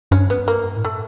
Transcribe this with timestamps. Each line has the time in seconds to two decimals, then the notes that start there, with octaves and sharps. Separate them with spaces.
0.11 G2 C#4
0.30 B3
0.48 A#3
0.76 A2
0.84 A3